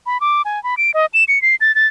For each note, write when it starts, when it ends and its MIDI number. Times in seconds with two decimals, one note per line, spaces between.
0.06 0.20 83
0.21 0.42 86
0.45 0.62 80
0.64 0.75 83
0.77 0.91 98
0.94 1.06 75
1.14 1.24 100
1.28 1.41 97
1.42 1.55 96
1.61 1.74 93
1.75 1.87 93